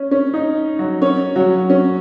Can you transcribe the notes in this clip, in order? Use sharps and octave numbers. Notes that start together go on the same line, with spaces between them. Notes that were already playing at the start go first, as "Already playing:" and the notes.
Already playing: C#4
C#4
D#4
F#3 F#4
C#4 C#5
F#3 F#4
C#4